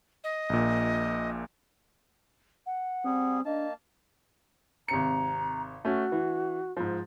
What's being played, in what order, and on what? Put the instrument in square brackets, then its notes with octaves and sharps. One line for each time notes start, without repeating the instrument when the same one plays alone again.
[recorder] D#5
[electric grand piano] A#1 A#2
[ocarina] F#5
[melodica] G3 G#4 [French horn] C4
[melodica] A#3 A5 [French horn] D4 [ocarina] D#5
[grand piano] G#1 C3 C#7 [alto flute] A#5
[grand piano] A3 C#4 [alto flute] F#4
[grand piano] E3
G#2 F3